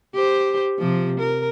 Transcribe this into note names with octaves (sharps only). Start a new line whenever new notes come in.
G4 C5
C3 F3
A#4